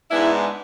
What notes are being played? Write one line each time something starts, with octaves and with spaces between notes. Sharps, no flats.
G#2 G#3 B3 D4 E4